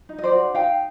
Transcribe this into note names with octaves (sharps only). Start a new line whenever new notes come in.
D#4
D#5
C5 D5
F#4
D#4 F5 G5